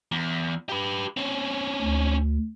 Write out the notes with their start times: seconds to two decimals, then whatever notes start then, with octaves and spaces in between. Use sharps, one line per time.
0.12 E2
0.69 G4 B4
1.17 C4 C#4
1.82 D2